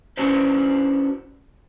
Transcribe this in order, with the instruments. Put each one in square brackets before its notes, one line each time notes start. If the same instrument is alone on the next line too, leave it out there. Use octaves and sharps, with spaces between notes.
[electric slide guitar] C#4 D4 E4 F#4 B4 C5